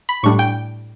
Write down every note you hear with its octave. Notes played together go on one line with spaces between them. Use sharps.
B5
A2 G3 D4 C#6
G5